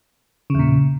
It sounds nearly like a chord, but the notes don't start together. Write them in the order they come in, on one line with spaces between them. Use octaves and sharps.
C#3 E2 A#2